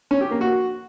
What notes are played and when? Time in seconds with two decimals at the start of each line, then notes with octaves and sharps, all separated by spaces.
0.11 C#4
0.21 G4
0.31 A#3
0.41 F#4